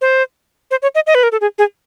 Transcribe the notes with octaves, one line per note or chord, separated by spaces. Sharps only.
C5
C5
C#5
D#5
D#5
B4
A#4
A4
G#4
G#4